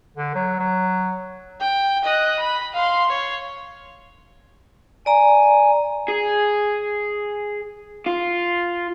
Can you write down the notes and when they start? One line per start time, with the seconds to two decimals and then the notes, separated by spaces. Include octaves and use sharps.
0.17 D3
0.35 F#3
0.59 F#3
1.60 G5
2.04 D#5 F#6
2.39 B5
2.73 F5 C6
3.08 C#5
5.06 D5 G#5 A#5
6.09 G#4
8.06 F4